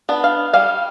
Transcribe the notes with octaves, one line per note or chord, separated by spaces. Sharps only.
B3 D4
F5
G3 F5